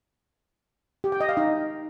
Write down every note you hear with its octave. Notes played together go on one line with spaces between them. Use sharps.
G4
G5
D#5
F5
D#4